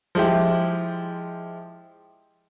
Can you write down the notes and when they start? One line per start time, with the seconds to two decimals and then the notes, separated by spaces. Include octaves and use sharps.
0.15 F3 G#3 E4 G4